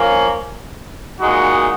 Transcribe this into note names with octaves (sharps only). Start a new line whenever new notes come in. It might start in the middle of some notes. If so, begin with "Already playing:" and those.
Already playing: F3 A#3 C#4
A#2 G#3 D#4 F#4